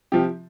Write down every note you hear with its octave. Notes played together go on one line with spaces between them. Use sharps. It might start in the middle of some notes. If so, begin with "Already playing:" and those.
C3 F3 G4